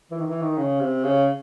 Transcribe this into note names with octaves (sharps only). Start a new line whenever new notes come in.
E3
D#3
E3
D#3
C#3
C3
C#3